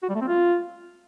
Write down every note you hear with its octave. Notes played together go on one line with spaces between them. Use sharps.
F#4
G3
A3
C4
F4